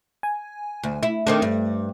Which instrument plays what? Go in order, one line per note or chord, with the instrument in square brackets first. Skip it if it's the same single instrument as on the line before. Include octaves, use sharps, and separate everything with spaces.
[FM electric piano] G#5
[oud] D2
E4
[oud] D#3 C4 D4 [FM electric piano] A3
[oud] G2